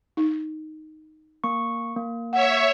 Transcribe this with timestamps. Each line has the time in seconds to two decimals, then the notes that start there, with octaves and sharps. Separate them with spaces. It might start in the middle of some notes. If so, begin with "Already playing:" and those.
0.17 D#4
1.44 A#3 C#6
1.96 A#3
2.33 C#5 E5 F#5